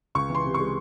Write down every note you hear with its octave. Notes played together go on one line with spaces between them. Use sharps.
C#2 C#6
E3 C6
C3
C#6
G#3